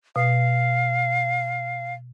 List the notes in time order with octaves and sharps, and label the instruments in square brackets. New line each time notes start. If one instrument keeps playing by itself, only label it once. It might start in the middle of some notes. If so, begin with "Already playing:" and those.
[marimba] B2 [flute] F5